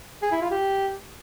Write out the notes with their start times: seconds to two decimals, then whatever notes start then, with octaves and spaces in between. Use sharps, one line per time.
0.22 G#4
0.32 E4
0.41 F4
0.51 G4